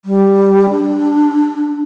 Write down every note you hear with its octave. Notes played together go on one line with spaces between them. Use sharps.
G3
D4